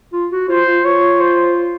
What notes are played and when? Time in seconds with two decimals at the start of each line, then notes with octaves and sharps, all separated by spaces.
0.13 F4
0.31 F#4
0.49 F4 C5
0.67 F4
0.85 F4 C#5
1.20 C5